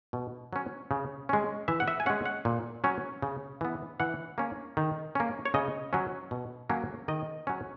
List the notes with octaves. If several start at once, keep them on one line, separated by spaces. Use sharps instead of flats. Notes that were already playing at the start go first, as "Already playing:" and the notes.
B2
F#3 C#4
C#3
G#3 C#4
E3 E5
F#5
E5
G#5
G#3 C#4 F#5
F#5
A#2
F#3 C#4
C#3
E3 B3
E3 F#5
A#3 C#4
D#3
A#3 C#4
C#5
C#3 D#5
F#3 C#4
B2
F#3 A#3 C#4
D#3 D#5
F#3 C#4